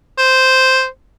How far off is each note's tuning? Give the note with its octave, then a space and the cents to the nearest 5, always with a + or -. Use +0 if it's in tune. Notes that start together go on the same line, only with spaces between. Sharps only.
C5 -5